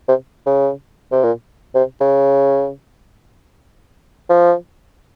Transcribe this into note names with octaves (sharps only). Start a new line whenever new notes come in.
C3
C#3
C3
A#2
C3
C#3
F3